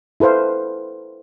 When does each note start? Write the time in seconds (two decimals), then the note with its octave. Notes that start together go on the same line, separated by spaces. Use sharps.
0.20 E4 A4 B4 C5 F5